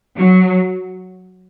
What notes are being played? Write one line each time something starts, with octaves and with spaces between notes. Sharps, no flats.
F#3